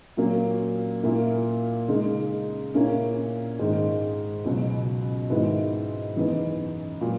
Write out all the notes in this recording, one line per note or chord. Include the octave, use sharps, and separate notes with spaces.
A#2 F#3 A#3 C#4
A#2 A#3 E4
C#3 G#3 D#4
A#2 A#3 C#4 E4
G#2 D#3 G#3 D#4
C#2 B2 F#3
G#2 D#3 G#3 B3 E4
F#2 E3 B3 D#4
A#2 F#3